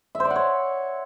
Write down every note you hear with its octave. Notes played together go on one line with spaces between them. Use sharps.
E5
C5
D5
F#5
C#5